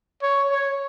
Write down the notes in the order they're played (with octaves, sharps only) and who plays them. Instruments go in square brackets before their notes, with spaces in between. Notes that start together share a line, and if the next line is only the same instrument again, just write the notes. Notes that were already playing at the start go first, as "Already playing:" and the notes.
[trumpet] C#5
C#5